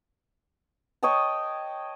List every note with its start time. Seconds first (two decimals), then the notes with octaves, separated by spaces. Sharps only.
1.03 C#5 D#5 G5 A5